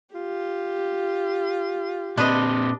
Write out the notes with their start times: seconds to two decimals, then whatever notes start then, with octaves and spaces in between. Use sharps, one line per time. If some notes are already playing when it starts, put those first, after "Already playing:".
0.15 F4 G4
2.18 A#2 C4 D4 B4 D#5